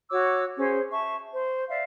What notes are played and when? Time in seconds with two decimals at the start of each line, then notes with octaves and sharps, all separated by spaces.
0.10 F#4 C#5 D6 E6
0.57 C#4 G#4 C5
0.92 E5 A5 C#6
1.32 C5
1.69 D5 E5 F5